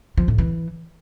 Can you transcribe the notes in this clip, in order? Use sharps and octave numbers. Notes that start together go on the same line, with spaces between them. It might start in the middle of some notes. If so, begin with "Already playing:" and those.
F3
A2
E3